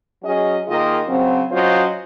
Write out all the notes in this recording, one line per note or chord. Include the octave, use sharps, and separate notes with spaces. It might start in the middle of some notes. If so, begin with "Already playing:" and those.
F#3 C#4 G#4 D#5
D#3 A#3 F4 G#4 D#5
C#3 F#3 C4
F#3 C#4 F4 C5 D#5